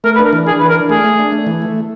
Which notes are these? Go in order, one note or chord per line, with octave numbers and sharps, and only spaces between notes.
A3 A#4
B4
D4
A#4
E3
D4 G#4
E3 B4
A#4
D4
A3 G#4
A3
D4
A3
E3
A3